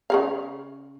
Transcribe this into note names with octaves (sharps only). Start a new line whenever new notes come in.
C#3 G#4 F5